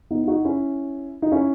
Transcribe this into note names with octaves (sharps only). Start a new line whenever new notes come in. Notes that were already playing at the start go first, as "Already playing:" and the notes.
B3 D#4
E4
D#4 F#4
C#4 E4
D#4
C#4 E4